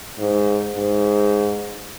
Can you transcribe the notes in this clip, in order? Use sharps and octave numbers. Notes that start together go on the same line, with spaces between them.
G#2
G#2